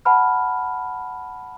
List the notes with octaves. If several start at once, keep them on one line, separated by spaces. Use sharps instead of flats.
F#5 A5 B5 F6